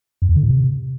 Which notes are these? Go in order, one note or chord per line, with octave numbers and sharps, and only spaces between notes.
F#2
E2
D3
A2
C3